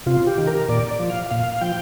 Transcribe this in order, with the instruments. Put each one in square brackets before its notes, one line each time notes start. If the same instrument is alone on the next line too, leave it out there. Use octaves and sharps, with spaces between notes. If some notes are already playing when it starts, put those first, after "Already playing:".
[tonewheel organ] C3 F4
G4
D#3
A#4
A#2 D5
F3
F5
A#2 F5
F3 G5